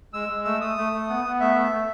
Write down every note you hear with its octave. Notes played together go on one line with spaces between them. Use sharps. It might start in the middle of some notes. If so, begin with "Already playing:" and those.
G#3 E6
G#3
A3 E6
A3 D#6
A3
A3
B3
B3
A3 E5
A3
A3